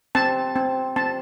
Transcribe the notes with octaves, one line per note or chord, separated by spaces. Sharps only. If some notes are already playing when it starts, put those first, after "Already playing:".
C4 A5
C4
C4 A5